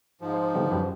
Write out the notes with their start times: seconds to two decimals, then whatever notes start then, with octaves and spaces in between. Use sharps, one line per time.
0.21 G#2 F3
0.34 C5
0.54 D3 G3 B3
0.71 F#2 G4 B4